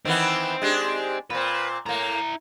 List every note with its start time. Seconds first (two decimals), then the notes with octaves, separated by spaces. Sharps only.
0.05 D#3 E3 B3 C4
0.62 G#3 D4 G4
1.30 A#2 C4 B4
1.86 A2 A#3 E4 A#5